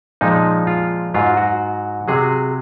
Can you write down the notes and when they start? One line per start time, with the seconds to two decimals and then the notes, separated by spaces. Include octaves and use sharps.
0.21 A#2 F3 G#3 D#4
0.67 F4
1.14 G#2 F#3 F4
1.37 F#4
2.08 C3 F#3 G#4